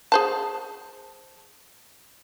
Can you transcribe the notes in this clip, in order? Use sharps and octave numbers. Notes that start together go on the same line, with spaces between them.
G#4 C5 A5